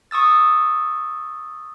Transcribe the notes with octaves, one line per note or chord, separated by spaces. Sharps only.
C#6 D#6 E6 A6